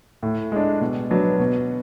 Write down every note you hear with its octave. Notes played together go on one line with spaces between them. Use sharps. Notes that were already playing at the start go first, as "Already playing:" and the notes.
A2
G#3 D4
B2
F#3 B3 D4
B2